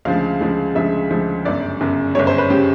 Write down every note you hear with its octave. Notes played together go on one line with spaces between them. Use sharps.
D2 C#3 F3 G#3 F5
D2 C#3 F3 G#3
D2 C#3 F3 G#3 E5
D2 C#3 F3 G#3
G1 F#2 C#3 D5
G1 F#2 C#3
G1 F#2 C#3 C#5
C5
B4
C#3 G4